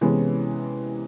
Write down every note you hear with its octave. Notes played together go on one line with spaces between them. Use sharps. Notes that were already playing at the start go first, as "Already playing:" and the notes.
C3 E3 G#3 B3 C#4